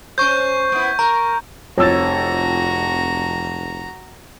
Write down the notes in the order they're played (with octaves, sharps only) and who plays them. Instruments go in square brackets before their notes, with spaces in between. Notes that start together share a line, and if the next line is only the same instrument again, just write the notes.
[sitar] C#4 C5 [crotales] C#6 G6
[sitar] B3 E4
[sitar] A#4 [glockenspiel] A#5
[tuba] F1 [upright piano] F2 E6 A6 [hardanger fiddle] F#4 A#5 [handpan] C#5